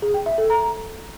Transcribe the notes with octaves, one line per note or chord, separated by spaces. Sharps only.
G#4
G5
E5
A4
A#5